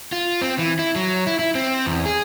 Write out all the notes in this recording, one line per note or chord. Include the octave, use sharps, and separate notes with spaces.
F4
C4
E3
E4
F#3
E4
E4
C4
E2
G#4